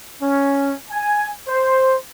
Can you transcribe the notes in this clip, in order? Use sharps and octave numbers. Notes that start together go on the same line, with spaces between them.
C#4
G#5
C5